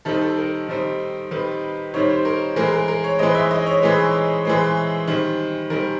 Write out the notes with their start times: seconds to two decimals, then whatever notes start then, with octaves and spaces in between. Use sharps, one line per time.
0.05 D#3 G3 C4 D#4 A4
0.21 A4
0.37 A#4
0.69 D#3 G3 C4 D#4
1.31 D#3 G3 C4 D#4 B4
1.94 D#3 G3 C4 D#4 C#5
2.10 C5
2.25 A#4
2.56 E3 G#3 C4 A#4
2.72 A#4
2.88 A#4
3.04 C#5
3.19 E3 G#3 C4 D#5
3.35 E5
3.51 D#5
3.67 C#5
3.82 E3 G#3 C4 B4
4.45 E3 G#3 C4
5.08 D#3 G3 C4
5.70 D#3 G3 C4 A#4